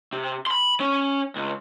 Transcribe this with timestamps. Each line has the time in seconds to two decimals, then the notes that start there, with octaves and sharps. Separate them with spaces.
0.13 C3
0.47 B5 C6
0.80 C#4
1.36 C#2